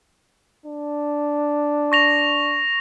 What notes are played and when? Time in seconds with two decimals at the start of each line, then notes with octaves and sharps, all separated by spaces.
0.66 D4
1.92 C#6 A#6 F7